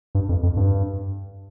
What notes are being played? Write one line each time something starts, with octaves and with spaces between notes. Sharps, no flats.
G2
F2
F2
G2